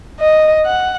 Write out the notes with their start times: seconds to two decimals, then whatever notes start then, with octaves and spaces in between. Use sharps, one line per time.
0.20 D#5
0.66 F#5